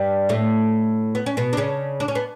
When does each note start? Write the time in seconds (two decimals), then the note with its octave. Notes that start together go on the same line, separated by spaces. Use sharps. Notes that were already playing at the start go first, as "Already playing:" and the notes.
Already playing: G2 G3
0.29 A2 A3
1.15 B3
1.26 C#4
1.37 B2 B3
1.53 D4
1.57 C#3 C#4
2.00 D4
2.08 C#4
2.15 B3